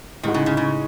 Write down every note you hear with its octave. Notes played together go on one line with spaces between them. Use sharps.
A2 D#3 G#3 D#4 F#4
C#3
C#3
C#3